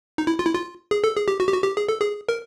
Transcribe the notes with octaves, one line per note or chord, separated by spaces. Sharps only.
D#4
E4
F4
E4
F4
G#4
A4
G#4
G4
F#4
G4
F#4
G4
G#4
A4
G#4
A#4